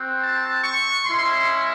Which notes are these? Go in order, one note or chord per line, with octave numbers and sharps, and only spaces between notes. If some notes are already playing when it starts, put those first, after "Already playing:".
Already playing: C4 F#4
A5
C#6
G#3 C#4 E4 C6